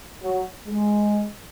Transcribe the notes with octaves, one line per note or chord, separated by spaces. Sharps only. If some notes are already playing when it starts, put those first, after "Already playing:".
F#3
G#3